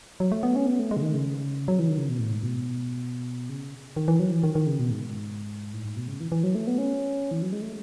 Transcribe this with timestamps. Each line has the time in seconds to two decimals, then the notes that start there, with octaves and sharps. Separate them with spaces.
0.20 F#3
0.32 A3
0.43 B3
0.56 C#4
0.66 B3
0.79 A3
0.91 G#3
0.97 C#3
1.02 D#3
1.14 C#3
1.68 F#3
1.79 E3
1.89 D#3
1.98 C#3
2.09 B2
2.20 A2
2.32 G#2
2.43 B2
3.49 C#3
3.96 D#3
4.08 E3
4.20 F#3
4.31 E3
4.43 D#3
4.55 D#3
4.67 C#3
4.79 B2
4.91 G#2
5.73 A2
5.85 G#2
5.97 B2
6.08 C#3
6.20 E3
6.32 E3
6.44 F#3
6.55 A3
6.67 B3
6.78 C#4
7.31 E3
7.42 F#3
7.52 G#3
7.62 A3